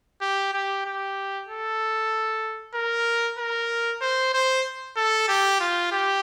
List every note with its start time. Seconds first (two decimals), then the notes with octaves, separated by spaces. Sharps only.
0.22 G4
0.53 G4
0.85 G4
1.48 A4
2.75 A#4
3.38 A#4
4.02 C5
4.34 C5
4.97 A4
5.28 G4
5.60 F4
5.92 G4